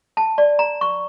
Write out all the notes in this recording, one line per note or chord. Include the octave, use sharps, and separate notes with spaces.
A5
D5
A#5
C#6